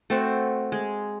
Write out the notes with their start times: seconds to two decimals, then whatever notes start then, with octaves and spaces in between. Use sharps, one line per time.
0.10 A3 C4 F#4
0.72 G#3